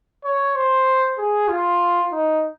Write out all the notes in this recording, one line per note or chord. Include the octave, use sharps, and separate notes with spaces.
C#5
C5
G#4
F4
D#4